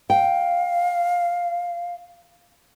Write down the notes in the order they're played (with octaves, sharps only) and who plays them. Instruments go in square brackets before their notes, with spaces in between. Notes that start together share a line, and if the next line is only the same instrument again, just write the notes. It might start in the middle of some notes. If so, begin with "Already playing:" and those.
[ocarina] F5 [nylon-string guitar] G5